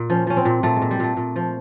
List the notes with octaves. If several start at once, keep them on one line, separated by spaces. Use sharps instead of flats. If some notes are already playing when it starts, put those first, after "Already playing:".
Already playing: A#2
F3 C#4
F3 C#4
C4
A#2
A#2 A3
G#3
A#2
G3
A#2 A3
A#2
F3